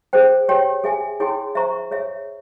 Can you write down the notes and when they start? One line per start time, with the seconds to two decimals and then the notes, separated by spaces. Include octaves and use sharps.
0.13 G#4 C5 G5
0.48 G4 C#5 G5
0.84 G#4 E5 G#5
1.20 E4 G#4 C#5 G5 C6
1.55 C5 E5 A#5 C#6
1.91 G#4 C#5 E5